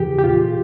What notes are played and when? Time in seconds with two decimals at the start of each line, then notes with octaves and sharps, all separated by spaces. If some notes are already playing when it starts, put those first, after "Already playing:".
Already playing: E2 C#3 E3 G4 G#4
0.19 G4
0.24 A#2 F4